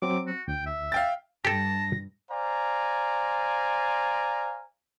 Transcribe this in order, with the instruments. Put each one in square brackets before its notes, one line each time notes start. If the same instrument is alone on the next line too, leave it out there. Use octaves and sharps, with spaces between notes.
[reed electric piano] F#3 C4 [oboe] D6
[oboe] F#4
[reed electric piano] D2 [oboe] G5
[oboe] E5
[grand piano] F5 G5 A6
[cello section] G2 [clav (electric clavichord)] G4 A4 [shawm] A5 [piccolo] A#6
[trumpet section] C5 D5 F5 G#5 A#5